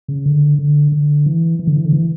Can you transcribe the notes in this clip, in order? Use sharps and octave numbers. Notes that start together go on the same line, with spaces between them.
C#3
D3
D3
D3
E3
E3
D3
E3
D3
E3